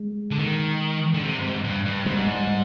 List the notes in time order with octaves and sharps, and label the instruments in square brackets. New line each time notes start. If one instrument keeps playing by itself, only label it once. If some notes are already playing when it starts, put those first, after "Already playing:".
Already playing: [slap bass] G#3
[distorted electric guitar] D3
D#3
D3
C3
G2
G#2
G2
G2
[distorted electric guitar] G#2 [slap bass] G3
[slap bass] G3
G3